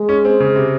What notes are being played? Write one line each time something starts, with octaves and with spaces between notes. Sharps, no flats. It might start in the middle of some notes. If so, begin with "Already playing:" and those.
Already playing: G#3
C#4
C4
C#3
C3